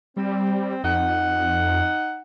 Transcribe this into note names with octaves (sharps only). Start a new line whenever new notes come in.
G3 C4
F2 D#4 F#5